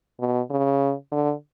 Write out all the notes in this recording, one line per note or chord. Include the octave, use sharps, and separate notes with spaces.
B2
C#3
D3